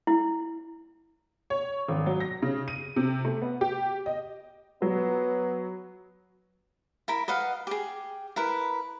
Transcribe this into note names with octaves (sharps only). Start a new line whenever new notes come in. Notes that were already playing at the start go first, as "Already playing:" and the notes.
E4
C#5
G#1
F#3
A#6
C#3
D#7
C3
A3
B3
G4
D#5
F#3 B3
E4 A#4 B5
B4 D#5 F5 F#5
G4 G#4
E4 A#4 B4